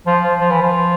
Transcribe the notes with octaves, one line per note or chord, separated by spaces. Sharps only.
F3
F3
F3
E3
F3